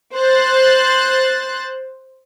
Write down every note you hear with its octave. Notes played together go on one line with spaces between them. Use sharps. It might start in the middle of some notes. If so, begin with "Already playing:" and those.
C5 F#6 A6